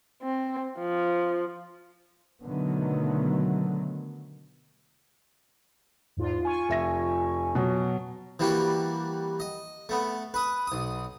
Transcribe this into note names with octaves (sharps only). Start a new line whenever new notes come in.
C4
F3
B2 D3 D#3 F#3 A3 B3
E2 G#2 F4
F4 G#5 C#6
F1 E5 A#6
B2 F#3
E3 G3 A#3 F#4
D#5
A3 B3
B4 D#6
B1 D#6